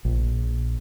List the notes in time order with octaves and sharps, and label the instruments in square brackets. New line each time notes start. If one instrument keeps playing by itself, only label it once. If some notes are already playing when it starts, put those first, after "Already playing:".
[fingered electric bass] A#1